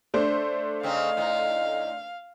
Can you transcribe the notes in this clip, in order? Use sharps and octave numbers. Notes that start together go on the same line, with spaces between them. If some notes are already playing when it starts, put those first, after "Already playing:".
A3 D4 C5
C#3 C4 D#4 F5
A2 D#4